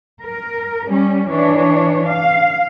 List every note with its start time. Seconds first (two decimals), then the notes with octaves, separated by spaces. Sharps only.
0.23 A#4
0.88 G3 C#4
1.29 E3 D4 C#5
2.09 F5